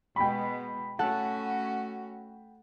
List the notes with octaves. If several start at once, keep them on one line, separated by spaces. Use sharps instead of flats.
B2 G#3 G5 B5
A3 C#4 F#4 A4 F#5 A5